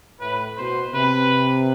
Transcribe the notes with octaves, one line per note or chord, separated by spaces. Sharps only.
A2 B4
B2 C5
C3 B4